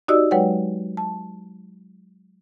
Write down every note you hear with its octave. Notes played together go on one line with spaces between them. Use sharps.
D#4 F#4 G4 D5 D#5 E6
F#3 G#3 B4 C#5 F#5 G5
A5